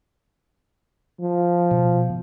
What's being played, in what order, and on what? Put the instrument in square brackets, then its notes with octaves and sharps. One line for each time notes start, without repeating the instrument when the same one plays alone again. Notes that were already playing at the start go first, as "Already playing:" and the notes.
[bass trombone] F3
[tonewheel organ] B2